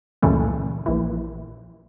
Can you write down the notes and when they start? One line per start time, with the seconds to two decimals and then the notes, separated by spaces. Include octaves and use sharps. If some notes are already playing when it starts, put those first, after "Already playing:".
0.22 C#2 F#2 A#2 C#3 E3 A3
0.86 A#1 E3